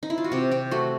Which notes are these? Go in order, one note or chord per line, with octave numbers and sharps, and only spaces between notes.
D#4
E4
F4
F#4
C3 G4
C3 G4
A3 F#4